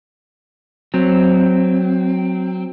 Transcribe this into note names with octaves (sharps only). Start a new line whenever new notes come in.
F#3 C4